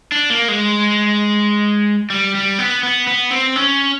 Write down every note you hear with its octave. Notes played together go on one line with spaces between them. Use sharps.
D4
A#3
G#3
G3
G3
B3
B3
B3
C4
C#4